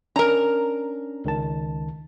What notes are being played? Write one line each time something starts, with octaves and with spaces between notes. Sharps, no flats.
C#4 D4 A#4 A#5
C#2 D#3 A5